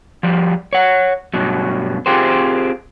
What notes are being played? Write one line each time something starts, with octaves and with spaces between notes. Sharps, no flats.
F3 G3
C#5 F#5
G2 B2 F#3
C4 F4 G4 G#4 C5